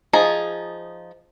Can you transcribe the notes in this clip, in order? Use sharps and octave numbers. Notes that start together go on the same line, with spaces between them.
F3 D#4 G#4 A#5